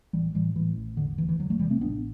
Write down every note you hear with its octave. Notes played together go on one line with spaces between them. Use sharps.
A1 E3 G3
A2 E3 G3
A2 E3
A1
E1 D3
D2 E3
E3
E1 D3 F#3
F#3 A3
C3 E3 G3
A3 C4
A1 B3 D4